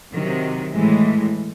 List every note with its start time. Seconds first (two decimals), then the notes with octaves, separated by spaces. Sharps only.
0.13 C3 D#3 F#3
0.73 A2 E3 G#3